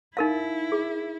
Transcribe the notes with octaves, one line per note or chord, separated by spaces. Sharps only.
D#4 E4 A#4 F5
G#4